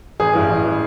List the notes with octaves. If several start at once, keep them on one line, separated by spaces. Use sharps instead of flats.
A1 G#4
G2 E3
A1
E3